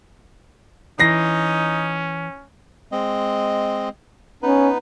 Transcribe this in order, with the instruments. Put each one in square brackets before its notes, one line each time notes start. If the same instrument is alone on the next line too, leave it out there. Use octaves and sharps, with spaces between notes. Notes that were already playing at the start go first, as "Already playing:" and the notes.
[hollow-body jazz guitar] E3 [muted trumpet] C#4 [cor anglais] D#4 [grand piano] A#6 C7
[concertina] G#3 C4 D#5
[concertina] B3 D#4 B4 [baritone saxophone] C#4